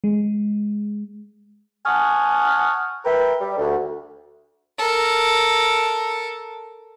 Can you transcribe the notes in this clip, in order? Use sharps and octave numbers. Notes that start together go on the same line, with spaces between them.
G#3
F#5 G#5 A5 C#6 D#6 F6
A#4 B4 E5 G5
G3
D2
A4 A#4